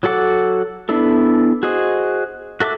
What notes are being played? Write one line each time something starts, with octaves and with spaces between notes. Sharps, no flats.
F#3 F#4 A4 F#5 D6
B3 D4 E4 A4
F#4 G#4 C5 D#5
F#4 A4 E5 C#6 D6